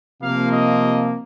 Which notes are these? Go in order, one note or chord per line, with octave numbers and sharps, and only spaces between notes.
C3 F3 A#3 F5
D#5